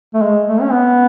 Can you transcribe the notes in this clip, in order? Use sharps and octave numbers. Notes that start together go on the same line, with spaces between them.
A3
G#3
A3
C#4
B3